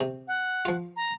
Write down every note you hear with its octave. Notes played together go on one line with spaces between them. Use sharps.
C3
F#5
F3 F4
A#5